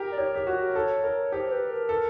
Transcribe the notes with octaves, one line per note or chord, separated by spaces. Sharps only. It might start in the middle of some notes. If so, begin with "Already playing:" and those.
Already playing: G4 A#4
D5
G4 C#5
G4
F#4
A4
A#4
G4 C5
B4
A#4
A4